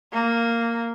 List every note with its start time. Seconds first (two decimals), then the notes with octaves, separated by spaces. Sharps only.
0.12 A#3